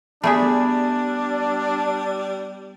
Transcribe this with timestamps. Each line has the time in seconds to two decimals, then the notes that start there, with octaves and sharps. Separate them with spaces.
0.24 G3 A3 B3 D4 G#4 E5